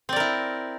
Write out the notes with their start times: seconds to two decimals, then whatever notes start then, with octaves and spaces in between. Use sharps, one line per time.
0.09 C4
0.13 D5
0.16 A#4
0.20 E4